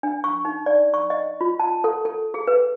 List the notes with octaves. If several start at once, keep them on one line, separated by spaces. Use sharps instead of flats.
D4
C#6
D#4
D5
C#6
D#5
F4
A5
A4
A4
G#4
B4